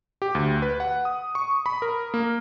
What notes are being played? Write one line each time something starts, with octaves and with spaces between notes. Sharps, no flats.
G4
D2
B4
F#5
D#6
C#6
B5
A#4
A#3